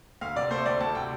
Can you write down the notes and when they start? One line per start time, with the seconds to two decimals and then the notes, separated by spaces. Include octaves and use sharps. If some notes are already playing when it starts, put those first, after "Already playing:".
0.21 D2 F5
0.36 C3 D5
0.50 A3 C5
0.66 D2 D5
0.80 D2 A5
0.95 C3 G5